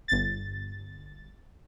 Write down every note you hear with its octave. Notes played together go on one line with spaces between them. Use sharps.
G1 A6